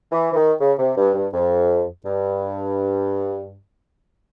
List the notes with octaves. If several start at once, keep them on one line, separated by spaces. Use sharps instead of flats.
E3
E3
D#3
C#3
C3
G2
G2
F2
G2